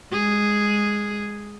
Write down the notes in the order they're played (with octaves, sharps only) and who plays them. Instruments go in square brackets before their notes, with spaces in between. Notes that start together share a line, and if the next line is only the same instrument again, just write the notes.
[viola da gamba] G#3 G#4